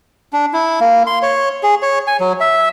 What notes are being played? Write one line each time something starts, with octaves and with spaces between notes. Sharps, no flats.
D4
E4
A#3
C6
C#5
G#4
C#5
G#5
F#3
E5